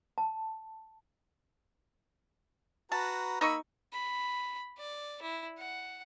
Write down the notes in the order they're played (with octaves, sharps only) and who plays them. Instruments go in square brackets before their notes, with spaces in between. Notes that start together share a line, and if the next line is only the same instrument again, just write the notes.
[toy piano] A5
[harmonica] F#4 B4 A#5 [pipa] A5
[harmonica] A#3 B5 E6 [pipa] D#4 D#5 C#6
[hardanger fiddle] B5
D5
E4
F#5